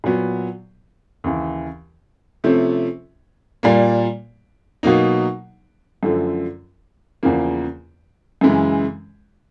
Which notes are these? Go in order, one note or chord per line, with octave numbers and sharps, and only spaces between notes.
A#2 F#3 B3
D#2 C#3 E3
C3 F3 A3 C#4
A#2 G3 A#3
B2 F#3 A#3 D#4
F#2 D3 F3 A3
E2 C#3 F3 A#3
F#2 C#3 E3 G#3